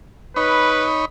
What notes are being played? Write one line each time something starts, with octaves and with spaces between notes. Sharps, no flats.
D#4 B4 C#5 B5